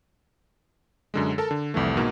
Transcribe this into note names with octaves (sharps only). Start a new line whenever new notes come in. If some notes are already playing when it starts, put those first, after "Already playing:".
F#2 D3 G#3
A4 A#4 A5
D3
C2 F2 E3 A3
G#2 B2 A#3